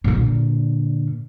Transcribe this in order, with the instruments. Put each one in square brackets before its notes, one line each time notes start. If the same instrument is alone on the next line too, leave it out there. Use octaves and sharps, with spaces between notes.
[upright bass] A#2 D3